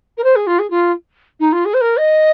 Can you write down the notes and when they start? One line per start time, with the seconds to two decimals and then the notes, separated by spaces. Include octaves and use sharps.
0.18 A#4
0.24 C5
0.36 G#4
0.47 F4
0.59 G#4
0.70 F4
1.40 D#4
1.52 F4
1.65 G#4
1.74 C5
1.81 A#4
1.97 D#5